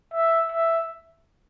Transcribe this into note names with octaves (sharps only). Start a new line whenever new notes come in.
E5
E5